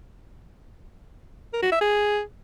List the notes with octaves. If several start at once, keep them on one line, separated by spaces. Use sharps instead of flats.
A#4
F#4
E5
G#4